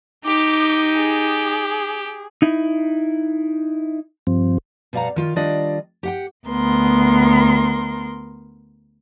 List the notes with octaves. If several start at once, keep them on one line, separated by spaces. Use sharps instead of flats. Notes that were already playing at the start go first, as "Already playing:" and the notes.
D#4 G4 D6
G#4
D#4 E4
G2 F3 C4
B2 G3 D5 F5 F#5 A#5
D#3 F4
D#3 G3 D4 F4 D5 D#5
G4 F#5 G5
D2 B3 A#4 C6